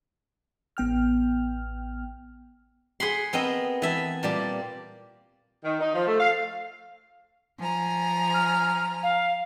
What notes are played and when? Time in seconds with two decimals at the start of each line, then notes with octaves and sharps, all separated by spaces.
0.77 A1 B3 G5 F6
3.00 G#4 F#5 B5 C6
3.33 B3 C4 A#4 D#5
3.82 E3 E5 A5
4.23 A#2 G3 D5 A5
5.64 D#3
5.80 D#4
5.95 F3
6.07 A3
6.20 F5
7.58 F3 G#5 A#5
8.34 F6
9.03 F5